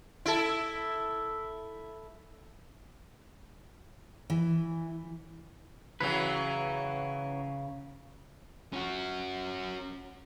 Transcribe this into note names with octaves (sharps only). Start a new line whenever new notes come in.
E4 A4
E3
C#3 E3 F#3 B4
C#4 F#4